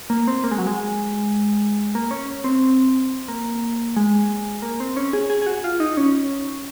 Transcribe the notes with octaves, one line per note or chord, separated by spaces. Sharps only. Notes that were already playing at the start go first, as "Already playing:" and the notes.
A#3
C4
A#3
G#3
F#3
G#3
A#3
C#4
C4
A#3
G#3
A#3
C4
C#4
G#4
G#4
G#4
F#4
F4
D#4
C#4